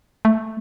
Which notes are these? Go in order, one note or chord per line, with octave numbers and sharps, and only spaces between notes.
A3